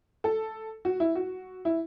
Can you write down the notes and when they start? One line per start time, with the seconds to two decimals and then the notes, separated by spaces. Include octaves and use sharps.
0.24 A4
0.85 F#4
1.00 E4
1.15 F#4
1.65 E4